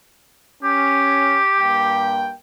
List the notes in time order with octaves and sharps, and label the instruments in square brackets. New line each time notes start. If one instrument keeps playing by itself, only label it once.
[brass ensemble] C#4 [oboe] G4
[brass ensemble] G2 A#3 G5